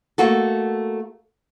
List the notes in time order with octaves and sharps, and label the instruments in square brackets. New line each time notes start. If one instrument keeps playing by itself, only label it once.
[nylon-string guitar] A3 A#3 F#4 A4